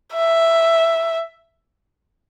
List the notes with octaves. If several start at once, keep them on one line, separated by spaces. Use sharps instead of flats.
E5